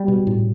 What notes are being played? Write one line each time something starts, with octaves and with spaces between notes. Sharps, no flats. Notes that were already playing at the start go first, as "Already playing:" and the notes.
Already playing: G3
B2
A2